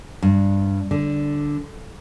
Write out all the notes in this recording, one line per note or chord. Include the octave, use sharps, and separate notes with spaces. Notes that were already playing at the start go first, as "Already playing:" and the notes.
G2
D3